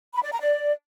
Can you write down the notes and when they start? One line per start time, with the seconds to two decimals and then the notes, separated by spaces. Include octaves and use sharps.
0.14 B5
0.23 D5
0.32 A#5
0.41 D5